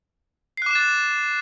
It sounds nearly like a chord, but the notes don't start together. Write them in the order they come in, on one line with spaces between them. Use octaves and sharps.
C7 F#6 D6 E7 A6